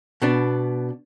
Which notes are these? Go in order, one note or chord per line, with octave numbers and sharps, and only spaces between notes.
B2 B3 D4